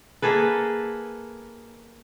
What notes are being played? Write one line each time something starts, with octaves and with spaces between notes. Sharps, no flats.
A#3 G#4 A4 B4